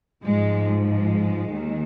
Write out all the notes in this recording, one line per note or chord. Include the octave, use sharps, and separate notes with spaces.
G#2 F3 G#3
G#3
D#2 D#3